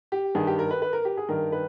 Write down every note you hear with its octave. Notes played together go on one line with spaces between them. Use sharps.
G4
G2 D#3 G#4
G4
A#4
B4
B4
A#4
G4
G#4
G2 D#3 A#4
B4